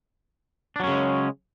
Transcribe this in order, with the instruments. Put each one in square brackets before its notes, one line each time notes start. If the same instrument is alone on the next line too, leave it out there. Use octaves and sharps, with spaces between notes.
[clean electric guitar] D4
F#3
C#4
C#3
G#3